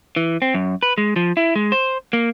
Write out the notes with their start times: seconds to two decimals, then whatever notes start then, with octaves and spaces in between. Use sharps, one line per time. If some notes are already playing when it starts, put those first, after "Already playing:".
0.16 E3
0.42 C4
0.54 F#2
0.83 B4
0.98 G#3
1.16 F3
1.37 E4
1.56 G#3
1.72 C5
2.13 A#3